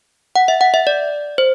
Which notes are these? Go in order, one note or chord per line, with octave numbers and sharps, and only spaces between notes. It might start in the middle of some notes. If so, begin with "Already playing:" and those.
F#5
E5
F#5
E5
D5
C5